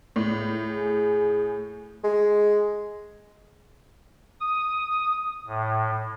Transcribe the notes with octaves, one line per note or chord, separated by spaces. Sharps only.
C#2 A2
G#4
G#3
D#6
A2